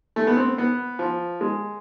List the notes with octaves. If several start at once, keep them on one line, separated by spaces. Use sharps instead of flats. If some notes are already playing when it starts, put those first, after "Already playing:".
A3
B3
C4
B3
F3
G#3